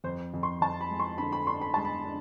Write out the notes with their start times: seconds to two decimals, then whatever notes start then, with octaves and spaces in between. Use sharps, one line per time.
0.04 F2 C5
0.34 F2
0.43 C6
0.61 F2 A5
0.81 B5
0.90 G#3
1.00 C6
1.18 D3 B5
1.32 B5
1.47 D4 C6
1.61 B5
1.74 G#3 A5
1.85 B5
2.05 D4